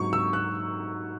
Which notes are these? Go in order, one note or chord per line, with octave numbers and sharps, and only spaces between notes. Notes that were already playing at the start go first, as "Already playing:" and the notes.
Already playing: G#2 F#3 C#6
E6
F#6